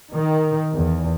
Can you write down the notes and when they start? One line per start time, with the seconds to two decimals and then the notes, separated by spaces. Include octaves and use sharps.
0.13 D#3
0.74 E2